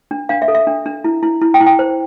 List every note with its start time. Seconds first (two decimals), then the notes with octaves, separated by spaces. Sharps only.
0.11 D4
0.29 D4 F5
0.42 E5
0.48 A4
0.55 E5
0.67 D4
0.86 D4
1.04 E4
1.23 E4
1.41 E4
1.54 G5
1.60 E4
1.66 G5
1.79 C5